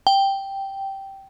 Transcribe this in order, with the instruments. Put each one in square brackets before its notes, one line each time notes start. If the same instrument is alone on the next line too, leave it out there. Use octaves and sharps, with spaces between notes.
[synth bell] G5